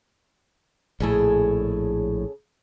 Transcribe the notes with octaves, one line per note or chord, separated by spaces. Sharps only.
A#1 A2 C#3 G#4 A4